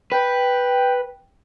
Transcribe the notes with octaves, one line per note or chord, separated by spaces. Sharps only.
B4 G5